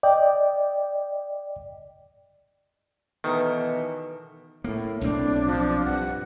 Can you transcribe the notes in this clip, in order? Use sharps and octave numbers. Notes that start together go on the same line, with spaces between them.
D5 D#5 G5
B2 D#3 E3 D#4 A4 B4
A2 A#3
B1 A2 C4 D4
F3
G2 F#5